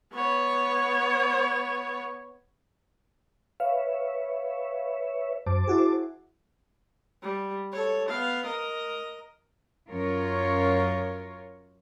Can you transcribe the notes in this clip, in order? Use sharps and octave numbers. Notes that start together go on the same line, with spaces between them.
B3 C#5
B4 C#5 E5 F5
F#2 C5 A5 D6
E4 F#4 G#4
G3
A4 C#5
B3 F5
A#4 D#5
F#2 F4 A#4 C#5